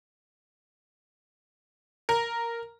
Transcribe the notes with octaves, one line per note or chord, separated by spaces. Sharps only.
A#4